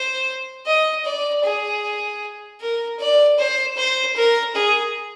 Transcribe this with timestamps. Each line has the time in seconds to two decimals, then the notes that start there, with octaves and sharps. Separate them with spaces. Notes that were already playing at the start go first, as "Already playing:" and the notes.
Already playing: C5
0.67 D#5
1.05 D5
1.44 G#4
2.61 A#4
2.99 D5
3.38 C5
3.77 C5
4.16 A#4
4.55 G#4